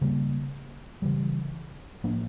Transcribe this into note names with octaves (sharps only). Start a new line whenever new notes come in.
C#3 G3 A#3
C#3 E3 G3
A2 F3 A#3 D4